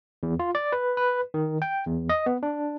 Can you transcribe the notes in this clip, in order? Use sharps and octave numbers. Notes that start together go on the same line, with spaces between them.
E2
F4
D5
B4
B4
D#3
G5
E2
D#5
B3
D4